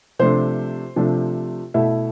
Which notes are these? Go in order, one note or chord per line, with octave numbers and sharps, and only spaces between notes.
C3 F3 A3 D4 C5
C3 F3 A3 D4
B2 A3 E4 E5